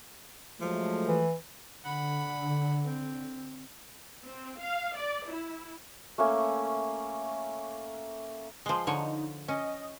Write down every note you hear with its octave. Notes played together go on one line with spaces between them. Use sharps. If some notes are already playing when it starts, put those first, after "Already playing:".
F3 F#3 G#3 A3
E3
D3 F#5 B5
C4
C4
F5
D5
E4
A3 A#3 C#4 E5
F3 G#3 C6
D3 F3 D#4 C#5
C#4 D#5